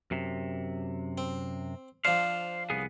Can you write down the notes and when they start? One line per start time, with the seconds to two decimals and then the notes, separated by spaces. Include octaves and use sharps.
0.11 F#2 C3
1.18 C4
2.05 F3 D4 C5 F5
2.70 C2 B3 G#4